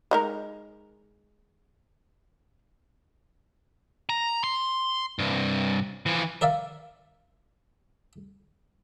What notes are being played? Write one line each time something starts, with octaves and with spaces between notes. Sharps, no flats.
G#3 D#4 A#4
A#5
C6
C2 G2
E3 F3
A#4 D5 E5 F5